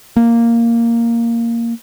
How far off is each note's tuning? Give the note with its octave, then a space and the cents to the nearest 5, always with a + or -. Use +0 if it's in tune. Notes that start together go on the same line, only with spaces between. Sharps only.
A#3 -5